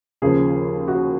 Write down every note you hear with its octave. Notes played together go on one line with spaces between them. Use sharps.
D#2 C#3 F3 G#4
F#4